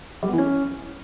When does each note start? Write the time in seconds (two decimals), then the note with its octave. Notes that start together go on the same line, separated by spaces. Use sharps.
0.23 G3
0.28 B3
0.33 E3
0.38 C#4